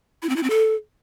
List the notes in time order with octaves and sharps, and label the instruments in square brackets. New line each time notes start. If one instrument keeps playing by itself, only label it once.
[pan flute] E4
C4
E4
C4
A4